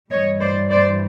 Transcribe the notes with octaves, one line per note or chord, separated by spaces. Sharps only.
G2 E3 G3 C#5 D#5
C5 D5
C5 D5